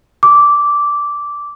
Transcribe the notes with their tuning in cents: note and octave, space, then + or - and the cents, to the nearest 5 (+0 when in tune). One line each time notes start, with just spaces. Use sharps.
D6 -10